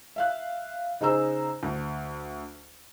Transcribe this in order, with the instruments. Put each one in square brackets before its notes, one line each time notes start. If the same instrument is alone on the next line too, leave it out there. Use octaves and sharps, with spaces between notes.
[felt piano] E5 F5 F#6
C#3 D#4 G#4 C5 A#5 E6
D2